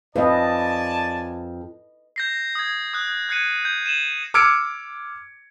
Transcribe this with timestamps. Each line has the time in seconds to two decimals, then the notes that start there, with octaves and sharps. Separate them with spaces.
0.16 F2 B4 D5 D#5 G#5 A5
2.16 G6 A#6 C7
2.55 D#6 G#6
2.94 D#6 F#6
3.29 F#6 G#6 C7 C#7 D#7
3.65 G6
3.86 D#7 E7 F#7
4.34 D6 E6 F6 G#6 C#7 D7